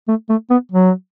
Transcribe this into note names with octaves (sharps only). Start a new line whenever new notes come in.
A3
A3
B3
F#3